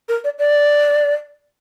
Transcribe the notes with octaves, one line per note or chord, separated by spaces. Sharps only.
A#4
D5
D5